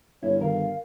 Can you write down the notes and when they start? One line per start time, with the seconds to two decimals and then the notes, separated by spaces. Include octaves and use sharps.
0.23 G1 E4 C#5
0.41 D#3 A#4 F5